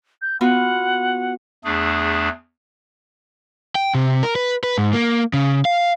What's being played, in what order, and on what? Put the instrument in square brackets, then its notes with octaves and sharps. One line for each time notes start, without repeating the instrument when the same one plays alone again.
[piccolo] G6
[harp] B3 F4 F#4 [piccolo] F#5
[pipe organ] E2 A3 D4 G#4
[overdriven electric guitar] G5
C3
A#4
B4
B4
G#2
A#3
C#3
F5